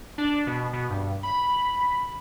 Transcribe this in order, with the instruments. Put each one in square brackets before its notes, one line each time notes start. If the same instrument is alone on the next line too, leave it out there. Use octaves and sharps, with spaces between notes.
[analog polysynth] D4
B2
B2
G2
B5